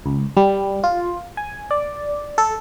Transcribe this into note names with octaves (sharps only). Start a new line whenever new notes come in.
C#2
G3
F4
G#5
D5
A4